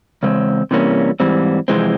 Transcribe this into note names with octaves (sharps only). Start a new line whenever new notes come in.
E2 C#3 G#3 C4
C3 E3 G3 A#3 C#4
G#2 E3 G3 C4
F2 C3 E3 G#3 C4